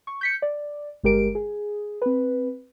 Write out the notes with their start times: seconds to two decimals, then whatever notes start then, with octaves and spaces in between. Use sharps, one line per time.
0.07 C#6
0.21 G6 B6 C#7
0.42 D5
1.04 G1 G#3 G4 A#4 D7
1.35 G#4
2.02 C4 B4